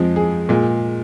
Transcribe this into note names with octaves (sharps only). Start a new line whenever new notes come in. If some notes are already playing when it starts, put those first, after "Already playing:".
Already playing: F2 F3 G#3
G#4
A#2 G#3